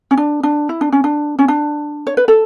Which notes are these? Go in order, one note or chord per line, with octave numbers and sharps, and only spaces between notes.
C#4
D4
D4
E4
D4
C#4
D4
C#4
D4
C#5
B4
A4